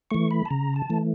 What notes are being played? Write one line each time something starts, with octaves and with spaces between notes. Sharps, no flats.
E3 A3 C#6
B5
A5
C#3 A#5
A5
E3 A3